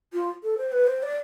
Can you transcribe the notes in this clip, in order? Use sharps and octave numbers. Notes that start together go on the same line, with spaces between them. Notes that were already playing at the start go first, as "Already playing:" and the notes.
F4
A4
C5
B4
C5
D5